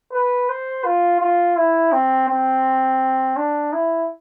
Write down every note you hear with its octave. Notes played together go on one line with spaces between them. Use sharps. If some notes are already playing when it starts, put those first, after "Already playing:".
B4
C5
F4
F4
E4
C4
C4
D4
E4